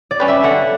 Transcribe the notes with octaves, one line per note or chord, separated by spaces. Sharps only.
D5
G3 C#4 G4 B4
E5
D3 F#5